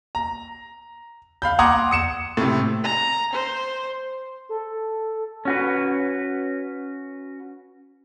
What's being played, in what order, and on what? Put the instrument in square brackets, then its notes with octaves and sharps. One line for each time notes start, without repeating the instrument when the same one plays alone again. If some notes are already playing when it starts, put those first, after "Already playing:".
[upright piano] A#5
F5 B5 G6
F#5 A#5 C6 D6 D#6 G#6
D#6 C#7 E7
A2 C3
[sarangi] A#5
C5
[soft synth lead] A4
[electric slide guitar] C#4 F#4 B4